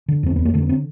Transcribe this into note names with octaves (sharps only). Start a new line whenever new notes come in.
D3
F2 C4
F2 B3
A#3
D3 A3
B3
C4